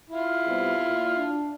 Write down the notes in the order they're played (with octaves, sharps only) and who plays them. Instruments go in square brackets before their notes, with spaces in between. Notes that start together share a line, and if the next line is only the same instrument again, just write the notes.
[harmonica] E4 F4
[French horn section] C3 G3 B3
A#2
D4